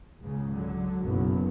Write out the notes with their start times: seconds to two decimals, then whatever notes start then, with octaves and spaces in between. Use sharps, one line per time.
0.23 C#2 G#2 C#3
0.53 D3 F#3
1.02 F#1 B1 F#3 B3